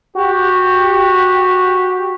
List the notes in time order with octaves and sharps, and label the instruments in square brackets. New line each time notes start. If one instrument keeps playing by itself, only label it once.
[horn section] F#4 G4